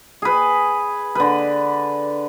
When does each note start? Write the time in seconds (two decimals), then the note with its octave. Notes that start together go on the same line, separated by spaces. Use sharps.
0.22 G#4 B4
1.15 D3 B4